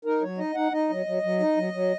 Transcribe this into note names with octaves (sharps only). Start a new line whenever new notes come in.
D#4 A#4
F#3 C#5
D#4 D#5
D#4 F#5
D#4 D#5
F#3
F#3
F#3
D#4
F#3
F#3